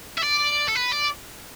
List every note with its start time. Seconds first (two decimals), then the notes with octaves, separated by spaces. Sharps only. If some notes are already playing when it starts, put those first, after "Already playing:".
0.18 E5
0.23 D5
0.68 A4
0.76 B4
0.92 D5